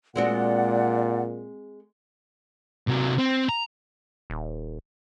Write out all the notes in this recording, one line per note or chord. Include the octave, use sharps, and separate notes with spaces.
A#2 G#3 C4 F#4 D5 F#5
C3 F#3
C4
A#5
D#1